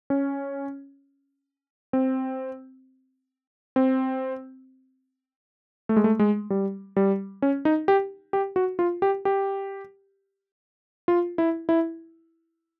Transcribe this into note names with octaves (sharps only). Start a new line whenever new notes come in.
C#4
C4
C4
A3
G#3
A3
G#3
G3
G3
C#4
D#4
G4
G4
F#4
F4
G4
G4
F4
E4
E4